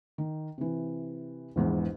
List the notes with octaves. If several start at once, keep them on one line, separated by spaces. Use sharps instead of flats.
D#3
C3 E3
A#1 E2 G#2 E3